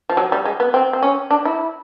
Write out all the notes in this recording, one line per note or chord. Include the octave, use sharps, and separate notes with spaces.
F3
F#3
G3
G#3
B3
C4
C4
C#4
D4
E4